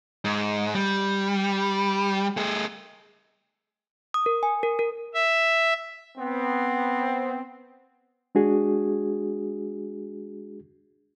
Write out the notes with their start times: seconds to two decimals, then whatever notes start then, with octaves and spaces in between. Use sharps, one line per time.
0.25 G#2
0.75 G3
2.37 A3 G#4
4.14 D#6
4.26 A#4
4.43 G#5
4.63 A#4
4.79 A#4
5.14 E5
6.17 B3 C4
8.35 G#3 D4 F#4 G#4